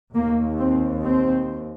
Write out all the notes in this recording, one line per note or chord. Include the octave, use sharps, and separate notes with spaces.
D#2 A#3
C4
C4